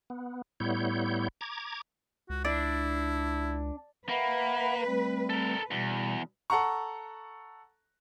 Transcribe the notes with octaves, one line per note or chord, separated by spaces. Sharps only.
B3
A2 G3 B3 E4 C#5 G6
A#5 D6 G#6
C#2 F#4
D4 E4
A#3 B4 E5 F#5 B5
G3 A3 C4
A4 A#4
E2 B2 G3
A4 F#5 A#5 C#6